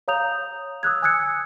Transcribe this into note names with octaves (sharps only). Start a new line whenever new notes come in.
C#5 F5 A#5 D#6 G6 F7
D#6 E6 F#6 G#6
G#5 D#6 E6 F#6 G#6 C#7